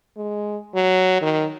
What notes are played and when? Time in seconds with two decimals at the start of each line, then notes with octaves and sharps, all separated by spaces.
0.17 G#3
0.75 F#3
1.22 D#3